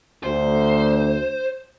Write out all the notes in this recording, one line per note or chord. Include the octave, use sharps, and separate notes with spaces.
D2 C5